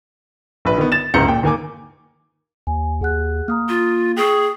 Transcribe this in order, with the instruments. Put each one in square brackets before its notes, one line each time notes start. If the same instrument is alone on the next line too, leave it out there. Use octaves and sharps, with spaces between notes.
[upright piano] A#1 B4
D#3 B3
A6 E7
F#1 C#2 A#5 G6 C#7
A#2 G5
D#2 A#3 G#5 D6
[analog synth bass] D#2 [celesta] G#5
[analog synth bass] D#2 [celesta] G#4 F#5 F#6
[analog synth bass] A#3 [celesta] A#5 D#6 F6
[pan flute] F4
[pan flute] G#4 [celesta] G5 C#6